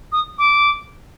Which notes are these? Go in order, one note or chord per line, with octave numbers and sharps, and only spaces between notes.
D#6
D6